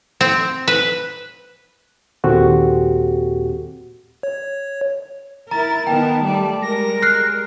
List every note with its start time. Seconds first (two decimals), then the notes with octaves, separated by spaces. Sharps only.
0.21 C4
0.68 B4
2.24 D#2 A#2 C4 F#4 G4 A4
4.23 C#5
5.51 E4 A#4 A#5 A6
5.87 D#3 B3 A#4 G5 A5
6.21 G3 A3 D5
6.62 G3 G#3 A#4 A#6
7.02 F6 F#6 C7